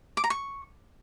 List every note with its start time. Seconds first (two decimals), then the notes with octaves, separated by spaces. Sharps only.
0.17 D6
0.24 A#5
0.30 C#6